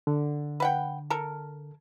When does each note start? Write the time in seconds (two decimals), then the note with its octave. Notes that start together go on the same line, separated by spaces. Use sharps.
0.07 D3
0.60 B4 F#5 G5
1.10 A4 A#4